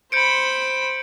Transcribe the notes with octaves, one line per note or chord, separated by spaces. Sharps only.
C5 B5 G6 C#7 D7